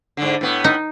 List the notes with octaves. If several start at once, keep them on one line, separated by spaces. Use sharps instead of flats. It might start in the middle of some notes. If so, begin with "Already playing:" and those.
G#2 D3
A2 B3
D#4